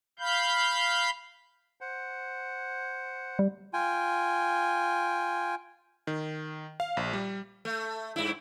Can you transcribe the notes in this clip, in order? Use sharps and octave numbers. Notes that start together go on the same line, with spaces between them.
F5 B5 G6
C5 F#5
G3
F4 G5 G#5
D#3
F5
A#1
G3
A3
G2 E4